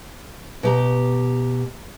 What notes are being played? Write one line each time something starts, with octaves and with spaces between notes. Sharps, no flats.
B2 G4 A#5